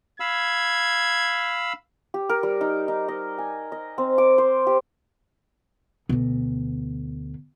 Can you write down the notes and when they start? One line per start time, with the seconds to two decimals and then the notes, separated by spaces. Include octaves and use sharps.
0.20 F5 B5 E6 G#6
2.14 G4
2.29 A#4
2.43 G3
2.61 D#4
2.88 D#4
3.08 D#5
3.38 G#5
3.72 D#5
3.98 C4
4.18 D6
4.38 C5
4.67 G4
6.09 D2 B2